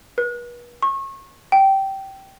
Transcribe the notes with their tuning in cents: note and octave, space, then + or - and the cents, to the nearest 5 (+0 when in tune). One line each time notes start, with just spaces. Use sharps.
B4 -40
C#6 -30
G5 -15